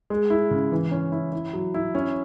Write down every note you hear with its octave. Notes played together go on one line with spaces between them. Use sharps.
G#3
E4
C#3
E3
C#4
E4
E4
F#3
E4
C#4